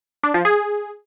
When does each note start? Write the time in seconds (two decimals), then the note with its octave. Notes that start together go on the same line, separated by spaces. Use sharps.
0.23 D4
0.34 F3
0.45 G#4